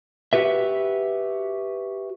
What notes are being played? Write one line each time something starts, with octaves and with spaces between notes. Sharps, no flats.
F#4 G4 B4 E5